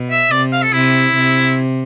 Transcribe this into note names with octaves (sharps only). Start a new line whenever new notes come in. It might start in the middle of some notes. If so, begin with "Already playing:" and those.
Already playing: B2
E5
C3 D5
F5
A4
C3 E4
C3